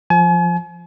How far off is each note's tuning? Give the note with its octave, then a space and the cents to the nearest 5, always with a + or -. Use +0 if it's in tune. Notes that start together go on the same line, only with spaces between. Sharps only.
F3 +0 G#5 +40